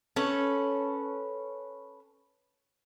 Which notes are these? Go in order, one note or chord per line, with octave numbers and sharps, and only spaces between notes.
C#4 A4 B4